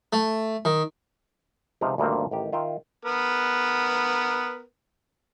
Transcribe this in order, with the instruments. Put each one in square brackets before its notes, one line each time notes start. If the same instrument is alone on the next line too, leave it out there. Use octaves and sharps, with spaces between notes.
[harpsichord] A3
D#3
[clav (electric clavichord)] C#2 C3 F3 D#4 C5 F5
D2 G2 A#2 D#3 A#3 C4
A1 D#3 G4
D#3 F4 E5 G5
[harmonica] B3 A#4 B4